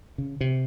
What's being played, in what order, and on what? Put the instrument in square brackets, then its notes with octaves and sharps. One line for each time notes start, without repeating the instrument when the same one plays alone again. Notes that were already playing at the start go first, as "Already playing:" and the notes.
[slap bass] C#3
C3